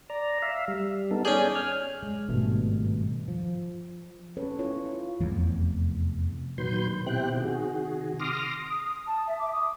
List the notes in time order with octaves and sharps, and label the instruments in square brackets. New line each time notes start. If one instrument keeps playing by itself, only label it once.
[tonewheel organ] D5 A#5
E5 F5
G3
B3 D#4 A4
[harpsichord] C#4 G#4 [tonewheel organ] D5 G#5 G6
[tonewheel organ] G#5 F6
[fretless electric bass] G#3
G#1 G2 B2 A3
F3
[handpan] C#4 A4 B4 C#5
A3 E4 F4 A4 C#5
F4
[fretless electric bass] F1 E2
[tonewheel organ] A#2 D#3 F#3 B4 C6 G6
B2 C4 E4 G4 G5 F#6
C3 D#3 F#4 G#4
C6 D6 D#6 F6 A#6
[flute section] D#6
D#6
A5
E5
D6
D#6